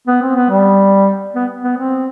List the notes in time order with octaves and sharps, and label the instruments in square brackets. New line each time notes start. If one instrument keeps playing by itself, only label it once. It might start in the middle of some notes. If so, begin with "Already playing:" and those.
[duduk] B3
C4
B3
G3
B3
B3
C4